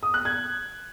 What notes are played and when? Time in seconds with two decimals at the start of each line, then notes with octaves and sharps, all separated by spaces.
0.03 D#6
0.14 F#6
0.25 G#6